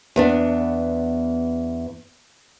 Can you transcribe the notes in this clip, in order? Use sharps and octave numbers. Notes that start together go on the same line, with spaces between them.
E2 B3 D4